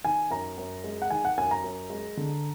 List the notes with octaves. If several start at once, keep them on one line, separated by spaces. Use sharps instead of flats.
D#3 G#5
F#2 A#5
F#2
G#3
F#5
D#3 G#5
F#5
F#2 G#5
A#5
F#2
G#3
D3